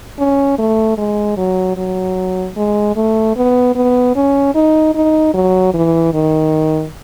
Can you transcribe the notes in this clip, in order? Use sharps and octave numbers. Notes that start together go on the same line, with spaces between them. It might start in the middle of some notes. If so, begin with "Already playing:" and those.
C#4
A3
G#3
F#3
F#3
G#3
A3
B3
B3
C#4
D#4
D#4
F#3
E3
D#3